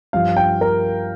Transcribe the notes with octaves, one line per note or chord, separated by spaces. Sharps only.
G2 F3 F5
G5
A#4